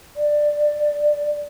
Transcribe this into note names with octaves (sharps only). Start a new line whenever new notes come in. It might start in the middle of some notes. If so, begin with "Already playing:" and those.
D5